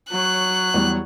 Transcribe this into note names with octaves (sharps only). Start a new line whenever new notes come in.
F#3 C#5 F#6
E2 G3